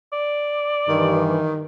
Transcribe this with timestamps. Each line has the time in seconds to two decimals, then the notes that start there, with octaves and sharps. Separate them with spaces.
0.13 D5
0.89 G2 D#3 E3